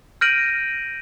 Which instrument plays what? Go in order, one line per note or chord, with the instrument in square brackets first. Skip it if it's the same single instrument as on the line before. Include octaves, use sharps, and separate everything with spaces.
[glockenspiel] F6 G6 A#6 D7 D#7 F#7